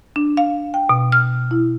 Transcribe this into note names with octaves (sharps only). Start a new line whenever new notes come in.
D4
F5
G5
B2
F6
E4